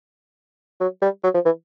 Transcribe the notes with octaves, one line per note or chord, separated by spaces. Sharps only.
F#3
G3
F#3
F3
E3